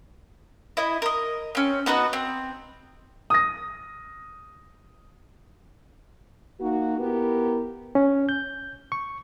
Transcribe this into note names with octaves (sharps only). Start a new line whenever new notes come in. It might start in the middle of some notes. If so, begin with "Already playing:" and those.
E4 D#5
A#4 D#5
C4 C#4
B3 D#4 F#4 B4
C4
D#6 A#6
A#3 D#4 F#4
B3 E4 G4 A#4
C#4
G6
C#6